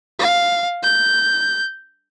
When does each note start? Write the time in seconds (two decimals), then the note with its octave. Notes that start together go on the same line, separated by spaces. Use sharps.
0.19 F5
0.83 G6